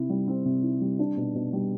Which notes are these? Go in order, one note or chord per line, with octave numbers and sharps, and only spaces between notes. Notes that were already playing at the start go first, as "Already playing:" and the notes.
Already playing: C3 C4 E4
G3
C4
C3
E4
G3
D4
B2
B2
G3